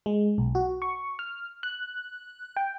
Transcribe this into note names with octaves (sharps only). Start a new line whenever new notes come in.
G#3
B1
F#4
C#6
F6
F#6
G5